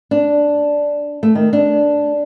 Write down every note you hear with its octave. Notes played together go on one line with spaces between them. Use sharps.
D4
A3
D#3
D4